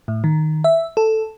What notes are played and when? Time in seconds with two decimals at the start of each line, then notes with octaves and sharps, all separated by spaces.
0.08 A2
0.24 D#3
0.64 E5
0.97 A4